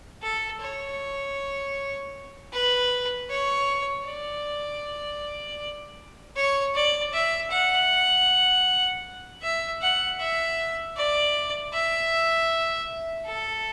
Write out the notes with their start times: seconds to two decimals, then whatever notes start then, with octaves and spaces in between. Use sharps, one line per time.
0.22 A4
0.61 C#5
2.53 B4
3.29 C#5
4.06 D5
6.36 C#5
6.75 D5
7.13 E5
7.51 F#5
9.42 E5
9.81 F#5
10.20 E5
10.96 D5
11.73 E5
13.26 A4